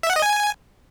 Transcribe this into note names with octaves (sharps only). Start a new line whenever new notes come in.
E5
F#5
D#5
G#5